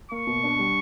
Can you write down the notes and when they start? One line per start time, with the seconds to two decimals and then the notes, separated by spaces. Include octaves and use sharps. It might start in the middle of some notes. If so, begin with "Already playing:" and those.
0.12 A#3 C#6
0.27 B2
0.44 D4
0.59 G3